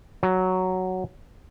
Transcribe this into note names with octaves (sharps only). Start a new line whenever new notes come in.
F#3